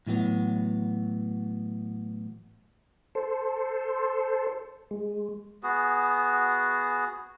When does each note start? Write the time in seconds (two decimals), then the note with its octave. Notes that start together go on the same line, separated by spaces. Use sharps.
0.07 A2 E3 F#3 B3
3.15 A4 C5
4.91 G#3
5.63 B3 F#4 G#4